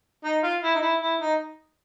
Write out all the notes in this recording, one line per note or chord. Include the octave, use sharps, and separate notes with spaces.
D#4
F4
E4
D#4
E4
E4
D#4